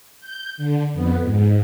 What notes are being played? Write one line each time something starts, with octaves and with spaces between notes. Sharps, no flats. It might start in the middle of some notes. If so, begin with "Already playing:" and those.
G6
D3
F2 B3
G#2